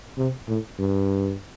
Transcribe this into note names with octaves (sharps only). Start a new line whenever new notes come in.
C3
A2
G2